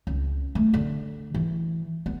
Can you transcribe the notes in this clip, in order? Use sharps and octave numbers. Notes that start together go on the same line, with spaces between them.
C#2
A3
D3
E3
B3